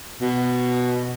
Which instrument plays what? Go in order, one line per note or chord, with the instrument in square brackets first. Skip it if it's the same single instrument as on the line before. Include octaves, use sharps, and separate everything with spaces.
[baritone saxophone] B2